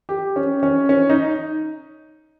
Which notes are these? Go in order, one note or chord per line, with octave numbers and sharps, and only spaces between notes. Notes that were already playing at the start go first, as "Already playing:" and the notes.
G4
C#4
C#4
C#4
D#4